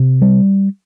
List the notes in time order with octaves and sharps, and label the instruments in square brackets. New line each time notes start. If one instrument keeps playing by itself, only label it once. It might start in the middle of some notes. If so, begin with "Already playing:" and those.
Already playing: [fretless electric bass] C3
G3